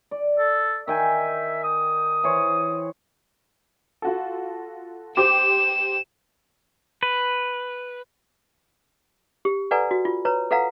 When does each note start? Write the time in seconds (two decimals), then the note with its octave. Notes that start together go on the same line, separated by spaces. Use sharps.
0.11 D5
0.39 A4
0.87 D#3 E5 G5 G#5
1.64 D#6
2.24 E3 C5 C#5
4.02 F4 F#4 A4
5.17 G4 C5 D6 E7
7.03 B4
9.45 G4
9.71 A4 B4 D5 F#5 G#5 A#5
9.91 F#4
10.05 F4
10.25 B4 C#5 A#5
10.51 A4 B4 F5 F#5 A#5